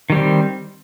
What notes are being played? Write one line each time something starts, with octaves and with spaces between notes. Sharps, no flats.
D#3 G3 C4